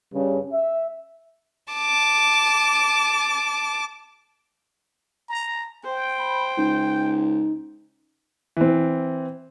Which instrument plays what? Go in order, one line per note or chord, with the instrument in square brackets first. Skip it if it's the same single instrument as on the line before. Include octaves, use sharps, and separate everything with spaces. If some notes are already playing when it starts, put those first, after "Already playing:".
[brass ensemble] G2 C#3
E5
[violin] A5 D6
[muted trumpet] A#5
[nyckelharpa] C5 [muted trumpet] G5
[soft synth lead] B5
[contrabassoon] C#2 [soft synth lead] D#4
[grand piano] E3 C4